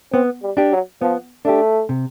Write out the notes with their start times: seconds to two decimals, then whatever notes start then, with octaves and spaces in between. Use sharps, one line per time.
0.13 B3 C4
0.43 G3
0.57 D4 G4
0.72 F#3
1.01 F3 B3
1.45 A3 D4 G4
1.89 C3